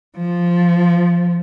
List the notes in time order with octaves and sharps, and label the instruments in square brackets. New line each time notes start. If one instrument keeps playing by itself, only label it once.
[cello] F3